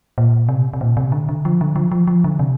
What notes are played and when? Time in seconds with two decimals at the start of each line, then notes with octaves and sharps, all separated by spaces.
0.18 A#2
0.49 C3
0.73 C3
0.81 A#2
0.97 C3
1.12 D3
1.29 D3
1.45 F3
1.61 D3
1.76 F3
1.92 F3
2.07 F3
2.24 D3
2.39 C3